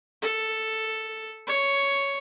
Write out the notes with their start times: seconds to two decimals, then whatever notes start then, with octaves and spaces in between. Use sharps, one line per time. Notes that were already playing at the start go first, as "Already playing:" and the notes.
0.22 A4
1.47 C#5